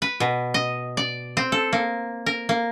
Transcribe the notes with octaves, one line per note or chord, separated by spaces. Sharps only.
B4
B2
D#5
D5
C4
A4
A#3
A#4
A#3